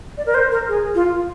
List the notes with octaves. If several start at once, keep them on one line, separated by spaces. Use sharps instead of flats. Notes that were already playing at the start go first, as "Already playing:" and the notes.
D5
A#4
C5
A#4
G#4
F4